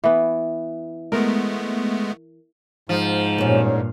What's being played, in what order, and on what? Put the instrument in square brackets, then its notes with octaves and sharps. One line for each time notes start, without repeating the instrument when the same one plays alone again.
[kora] E3 B3
[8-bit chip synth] G#3 A3 B3 [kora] A#4
[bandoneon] G#2 [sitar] F3
[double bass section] G2 A#2 [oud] B3 C#4